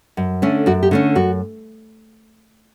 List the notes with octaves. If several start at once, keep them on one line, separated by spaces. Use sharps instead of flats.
F#2
D3 A3 C#4
F#2 F#4
G4
D3 A3 C#4
F#2 F#4